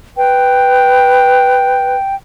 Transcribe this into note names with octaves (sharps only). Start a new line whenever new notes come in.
B4 G5